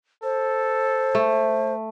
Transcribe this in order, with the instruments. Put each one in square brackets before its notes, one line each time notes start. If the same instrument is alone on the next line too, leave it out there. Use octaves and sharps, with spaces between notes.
[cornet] A4 [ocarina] C5
[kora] A3